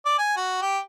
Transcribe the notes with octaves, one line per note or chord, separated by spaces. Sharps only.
D5
G#5
F#4
G4